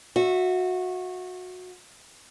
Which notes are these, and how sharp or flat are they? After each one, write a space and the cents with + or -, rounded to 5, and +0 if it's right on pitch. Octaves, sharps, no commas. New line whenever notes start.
F#4 -20 E5 +0